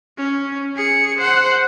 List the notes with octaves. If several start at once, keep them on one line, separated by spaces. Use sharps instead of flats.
C#4
G#4 C#7
C5 F#5